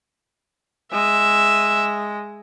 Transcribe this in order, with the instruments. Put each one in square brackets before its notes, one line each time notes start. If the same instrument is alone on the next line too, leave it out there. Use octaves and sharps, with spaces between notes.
[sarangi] G#3 [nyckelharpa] E5